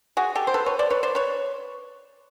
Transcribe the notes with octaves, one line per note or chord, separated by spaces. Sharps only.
F#4 G#4
G4 A4
C5
A4 B4
B4 C#5
C5 D5
B4 C#5
C5 D5
B4 C#5